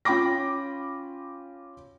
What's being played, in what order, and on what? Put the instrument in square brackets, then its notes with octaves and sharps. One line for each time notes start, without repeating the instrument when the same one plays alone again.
[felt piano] C#4 F4 G5 B5 D6 A#6